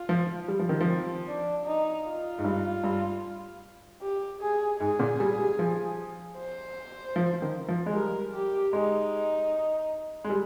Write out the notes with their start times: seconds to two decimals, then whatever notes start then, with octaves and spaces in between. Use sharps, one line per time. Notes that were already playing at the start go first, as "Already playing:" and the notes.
Already playing: F4
0.09 F3
0.48 G3
0.59 F3
0.69 D#3
0.81 F3
0.88 C4
1.27 D4
1.66 D#4
2.06 F4
2.38 G#2
2.44 G2
2.84 G2
4.02 G4
4.41 G#4
4.80 G#2 G#4
4.99 A#2
5.20 G3
5.39 G3
5.59 F3
6.37 C5
7.16 F3
7.42 D#3
7.68 F3
7.86 G#3
7.94 G3 A#4
8.34 G4
8.73 G#3 D#4
10.24 G#3
10.30 G3